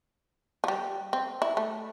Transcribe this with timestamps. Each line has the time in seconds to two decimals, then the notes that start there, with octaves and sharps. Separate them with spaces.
0.64 F3
0.68 G3
1.13 C4
1.42 E4
1.57 A3